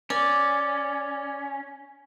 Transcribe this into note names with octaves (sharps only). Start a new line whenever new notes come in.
C#4 D5